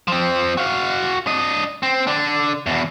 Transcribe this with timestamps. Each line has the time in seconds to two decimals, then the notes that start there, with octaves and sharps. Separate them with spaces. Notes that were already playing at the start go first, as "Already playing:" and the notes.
0.08 F3 C4
0.57 F#4 F5
1.27 D4 D#5
1.83 C4
2.07 D3 D4
2.66 E2 B2